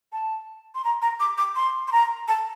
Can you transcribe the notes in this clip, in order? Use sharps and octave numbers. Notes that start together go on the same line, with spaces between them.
A5
C6
A#5
A#5
D6
D6
C6
C6
A#5
A5